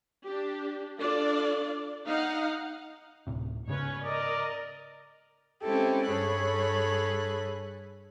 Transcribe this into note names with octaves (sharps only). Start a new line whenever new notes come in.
D4 G4
D4 F4 A4 D5
D#4 F5 F#5
D1 A2 C3
G#2 C#3 C#4 B4 C#5
A#4 D5 D#5
G#3 C4 C#4 E4 G4 A4
G2 G#4 A4 C#5 B5 F#6